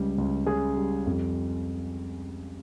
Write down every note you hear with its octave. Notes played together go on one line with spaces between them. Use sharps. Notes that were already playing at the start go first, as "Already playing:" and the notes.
Already playing: C#2 G3
C#2
C#3 G#4
G3
F2